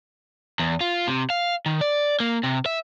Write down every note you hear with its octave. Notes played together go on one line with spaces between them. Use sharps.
E2
F4
C3
F5
D#3
D5
A#3
C3
E5